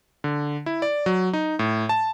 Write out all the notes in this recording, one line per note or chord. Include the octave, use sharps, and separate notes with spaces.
D3
E4
D5
F#3
D#4
A2
A5